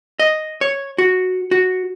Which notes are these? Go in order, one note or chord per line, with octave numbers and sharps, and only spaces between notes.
D#5
C#5
F#4
F#4